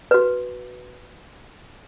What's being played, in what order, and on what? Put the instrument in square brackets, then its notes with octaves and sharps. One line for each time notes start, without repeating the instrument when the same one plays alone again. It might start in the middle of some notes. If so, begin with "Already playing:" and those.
[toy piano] F#4 B4